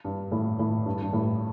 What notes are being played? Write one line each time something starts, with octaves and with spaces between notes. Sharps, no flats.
G2
A2
A2
G2
G2
A2